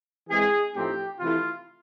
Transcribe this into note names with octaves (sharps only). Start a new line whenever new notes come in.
E3 G#3 C4 G#4
A2 F3 A3 C4 D#4 G4
C3 E3 A3 F4